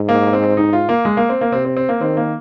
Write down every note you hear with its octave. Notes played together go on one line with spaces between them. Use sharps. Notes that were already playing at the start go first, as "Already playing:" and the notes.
Already playing: G#2
A#3
C4
D#4
F4
A#3
G#3
A#3
C4
A#3
C3 C4
C4
C4
A#3
D#3 C4
A#3